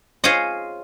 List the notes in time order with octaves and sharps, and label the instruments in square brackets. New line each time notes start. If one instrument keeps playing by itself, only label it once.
[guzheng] F4 G#4 C5 C#5 D#5